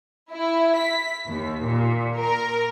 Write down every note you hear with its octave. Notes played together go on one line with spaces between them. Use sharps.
E4
B6
D#2
A#2
A#4